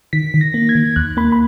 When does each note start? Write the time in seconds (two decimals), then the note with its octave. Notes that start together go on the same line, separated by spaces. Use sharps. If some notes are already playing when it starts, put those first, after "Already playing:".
0.13 D#3 B6
0.34 D#3
0.41 A#6
0.54 A#3
0.69 G#6
0.75 D#3
0.96 D#2 F#6
1.17 A#3 B5
1.32 B5